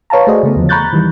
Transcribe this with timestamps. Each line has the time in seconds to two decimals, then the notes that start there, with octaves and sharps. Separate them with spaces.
0.10 B4 C#5 F5 A5 A#5
0.27 A3 F#4 G#4 C5 D5 D#5
0.43 C#3 A3 B3
0.56 E2 D3 F3
0.69 A#5 B5 C#6 F#6 G6 A6
0.93 D#3 E3 G3